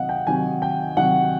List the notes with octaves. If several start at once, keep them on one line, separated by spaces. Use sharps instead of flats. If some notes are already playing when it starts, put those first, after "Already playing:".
Already playing: C3 D#3 F#3 D#5 F5 F#5
G5
C3 D#3 F#3 G#5
G5
C3 D#3 F#3 F#5